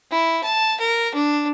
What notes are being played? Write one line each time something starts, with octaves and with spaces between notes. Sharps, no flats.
E4
A5
A#4
D4